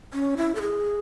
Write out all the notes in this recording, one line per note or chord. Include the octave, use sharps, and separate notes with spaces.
C#4
E4
A4
G#4